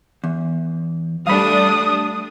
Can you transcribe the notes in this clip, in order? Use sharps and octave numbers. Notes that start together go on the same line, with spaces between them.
E2
G3 A3 D4 F5 B5 D#6